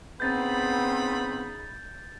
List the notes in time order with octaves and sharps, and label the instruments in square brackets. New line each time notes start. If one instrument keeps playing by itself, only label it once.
[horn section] C#3 D#4 B5 [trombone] B3 [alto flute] C4 [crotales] G6 A6